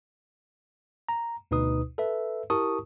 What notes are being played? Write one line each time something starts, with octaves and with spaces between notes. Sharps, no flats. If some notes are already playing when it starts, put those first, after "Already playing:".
A#5
D2 B2 D#4 B4 D#6
A4 B4 E5
E4 G4 A#4 A5 C#6 D#6